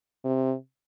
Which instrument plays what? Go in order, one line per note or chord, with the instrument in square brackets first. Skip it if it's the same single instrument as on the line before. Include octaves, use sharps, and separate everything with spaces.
[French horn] C3